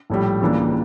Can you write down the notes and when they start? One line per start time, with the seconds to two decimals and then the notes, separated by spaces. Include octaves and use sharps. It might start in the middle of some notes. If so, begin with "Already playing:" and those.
0.10 A#1 A2 G3
0.41 C#2 C#3 E3 A#3 D4